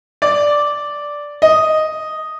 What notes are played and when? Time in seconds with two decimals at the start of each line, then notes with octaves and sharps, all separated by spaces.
0.22 D5
1.42 D#5